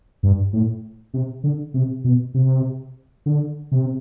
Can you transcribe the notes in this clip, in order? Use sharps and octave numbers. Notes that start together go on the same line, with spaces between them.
G2
A2
C3
D3
C3
B2
C3
D3
C3